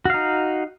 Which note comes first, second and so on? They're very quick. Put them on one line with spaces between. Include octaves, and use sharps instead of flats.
F#4 F5 D#4